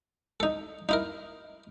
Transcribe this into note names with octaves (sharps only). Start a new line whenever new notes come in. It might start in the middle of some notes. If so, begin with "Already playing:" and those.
D#4 A4
D#4 E4 A#4